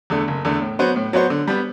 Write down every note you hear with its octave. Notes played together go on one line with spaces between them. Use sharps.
E2 D3 A3
F#1
E2 D3 A3
A2
F#3 B3 F#4 C5
A2
F#3 B3 F#4 C5
D3
G3 B3